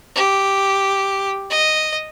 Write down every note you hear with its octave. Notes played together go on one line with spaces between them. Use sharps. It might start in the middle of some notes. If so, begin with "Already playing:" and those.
G4
D#5